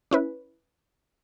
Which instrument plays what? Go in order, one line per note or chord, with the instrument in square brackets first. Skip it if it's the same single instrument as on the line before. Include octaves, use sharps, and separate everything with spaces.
[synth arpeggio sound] C#4 E4 B4